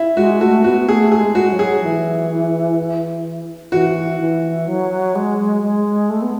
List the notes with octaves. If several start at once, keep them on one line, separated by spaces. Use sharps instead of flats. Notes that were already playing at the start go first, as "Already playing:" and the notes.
Already playing: E4
G#3 F#4
A3 F#4
B3 F#4
A3 G#4
G#4
G#3
F#4
F#3
G#4
E3
E3 F#4
E3
F#3
G#3
G#3
A3
B3